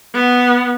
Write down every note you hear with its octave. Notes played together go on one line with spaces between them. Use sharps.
B3